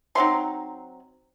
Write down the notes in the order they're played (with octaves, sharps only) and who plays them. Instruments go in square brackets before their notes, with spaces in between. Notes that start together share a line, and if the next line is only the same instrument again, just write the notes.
[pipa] C3 F#3 C4 D#4 C6